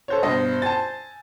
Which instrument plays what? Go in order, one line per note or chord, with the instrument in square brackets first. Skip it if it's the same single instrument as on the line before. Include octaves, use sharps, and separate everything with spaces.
[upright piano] A4 C5 C#5
[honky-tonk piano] G2 B2 [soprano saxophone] C5 [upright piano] D#5
[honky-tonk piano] G#5 [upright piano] A5 A6